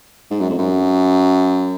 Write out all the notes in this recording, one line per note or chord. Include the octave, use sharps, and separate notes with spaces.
G#2
F#2
F2
F#2